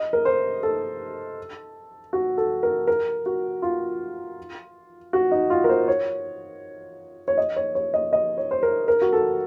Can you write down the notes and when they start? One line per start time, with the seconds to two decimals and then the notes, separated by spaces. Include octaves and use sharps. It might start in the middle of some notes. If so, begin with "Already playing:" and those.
Already playing: D#5
0.13 A#4
0.25 C5
0.63 A4
2.13 F#4
2.38 A4
2.63 A#4
2.87 A#4
3.26 F#4
3.62 F4
5.13 F#4
5.32 D#4
5.50 F4
5.64 A#4
5.69 C5
5.88 C#5
7.28 C#5
7.38 D#5
7.56 C#5
7.75 C#5
7.94 D#5
8.13 D#5
8.38 C#5
8.51 C5
8.63 A#4
8.88 A#4
9.02 F#4
9.13 A4